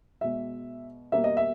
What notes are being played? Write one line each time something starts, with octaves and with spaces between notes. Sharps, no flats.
B2 G#3 E5
B2 G3 A#3 E5
D#5
E5